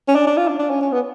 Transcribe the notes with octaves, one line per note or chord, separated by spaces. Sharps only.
C#4
D4
D4
F4
D4
D4
C#4
C#4
B3